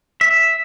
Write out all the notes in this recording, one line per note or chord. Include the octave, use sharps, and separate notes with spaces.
E5